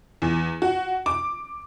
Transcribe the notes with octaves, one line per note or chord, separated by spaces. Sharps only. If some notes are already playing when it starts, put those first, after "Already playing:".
E2
F#4
D6